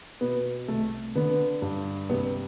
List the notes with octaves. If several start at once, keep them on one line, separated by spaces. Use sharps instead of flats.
B2 B3
C2 A3
D3 B3
G2
C3 B3